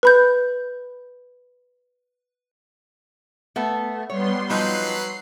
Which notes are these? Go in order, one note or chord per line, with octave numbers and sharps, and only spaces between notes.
B4 B5 G6
A3 B3
G3 B3 C#5 C6
F3 F#3 D#4 B4 C7